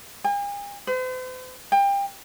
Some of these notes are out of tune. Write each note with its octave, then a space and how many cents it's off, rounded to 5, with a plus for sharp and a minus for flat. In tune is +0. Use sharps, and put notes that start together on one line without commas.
G#5 -45
C5 -45
G5 +25